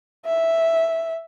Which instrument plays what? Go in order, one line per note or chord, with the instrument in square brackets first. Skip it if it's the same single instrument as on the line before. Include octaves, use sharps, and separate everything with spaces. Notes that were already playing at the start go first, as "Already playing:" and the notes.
[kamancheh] E5